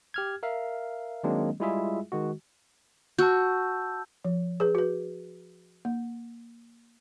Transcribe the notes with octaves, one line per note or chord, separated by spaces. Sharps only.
G4 F6 G#6
A#4 E5 F5
D#3 F#3 G#3 A#3 C4 D4
G3 G#3 E4 F4 G#4 E5
D#3 G#3 F#4
F#4 A5 E6 G6
F3
G#4 B4
F#4 B4
A#3